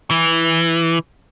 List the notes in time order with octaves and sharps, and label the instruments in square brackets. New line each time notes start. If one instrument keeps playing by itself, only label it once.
[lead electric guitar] E3